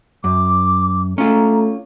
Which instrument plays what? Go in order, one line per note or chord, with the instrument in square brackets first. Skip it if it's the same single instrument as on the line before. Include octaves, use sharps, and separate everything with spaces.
[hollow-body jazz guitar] F#2 [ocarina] D6
[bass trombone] A3 [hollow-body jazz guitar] C#4 F4 [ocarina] A#5